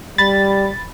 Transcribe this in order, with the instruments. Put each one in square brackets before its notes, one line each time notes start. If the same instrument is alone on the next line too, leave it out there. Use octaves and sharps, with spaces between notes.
[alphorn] G3 [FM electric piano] B5 A6